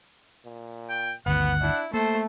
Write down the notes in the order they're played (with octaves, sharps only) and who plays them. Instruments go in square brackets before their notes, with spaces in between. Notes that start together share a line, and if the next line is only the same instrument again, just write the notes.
[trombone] A#2
[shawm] G5
[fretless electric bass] G1 D2 D#3 [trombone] B3 [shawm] F#5
[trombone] D4 [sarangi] E4
[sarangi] A3 [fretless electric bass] A#3 [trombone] A4 [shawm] C5